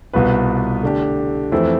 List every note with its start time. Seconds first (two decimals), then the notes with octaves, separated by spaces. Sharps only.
0.13 C2 B2 B3 F4 B4
0.83 D3 A3 D4 G4
1.52 F2 E3 A3 C4 E4